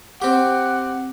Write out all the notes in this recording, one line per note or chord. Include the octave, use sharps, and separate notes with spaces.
C4 G4 F#5